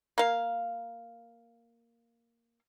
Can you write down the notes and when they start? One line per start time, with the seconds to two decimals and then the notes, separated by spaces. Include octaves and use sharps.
0.18 A#3 F5